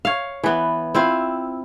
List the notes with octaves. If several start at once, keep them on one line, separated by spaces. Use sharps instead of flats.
C#5 F5
E3 B3
C4 E4 F4